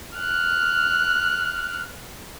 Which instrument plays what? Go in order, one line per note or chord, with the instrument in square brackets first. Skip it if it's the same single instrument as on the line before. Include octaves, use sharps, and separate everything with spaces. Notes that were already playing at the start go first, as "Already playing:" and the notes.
[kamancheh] F6 F#6